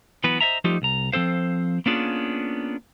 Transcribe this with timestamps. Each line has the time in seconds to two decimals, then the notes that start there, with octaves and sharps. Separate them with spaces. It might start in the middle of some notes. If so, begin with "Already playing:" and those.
0.24 E3 F#3 B3 F#4 B4
0.41 C5 C#5 D#5 E5 A#5
0.64 F3 G3 A3 D#4 F4 G4
0.82 C2 A#5
1.12 F3 C4 A4 C5 F5
1.86 A#3 B3 C#4 D4 F4 G#4